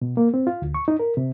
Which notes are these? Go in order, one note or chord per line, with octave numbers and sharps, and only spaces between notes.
B2
A#3
C4
F4
D2
C#6
D#4
A#4
C3